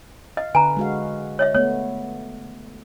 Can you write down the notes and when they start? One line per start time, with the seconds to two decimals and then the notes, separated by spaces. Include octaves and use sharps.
0.37 D#5 F5
0.55 D3 B4 G#5 A#5
0.77 G#3 F#4 F5
1.39 C#5 D#5 E5
1.54 A3 B3 C#5